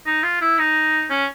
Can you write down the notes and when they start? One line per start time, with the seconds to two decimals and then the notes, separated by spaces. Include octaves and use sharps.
0.06 D#4
0.23 F4
0.41 E4
0.59 D#4
1.10 C#4